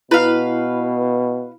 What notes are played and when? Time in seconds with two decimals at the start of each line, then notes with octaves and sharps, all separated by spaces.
0.11 B2 E4 B4 F5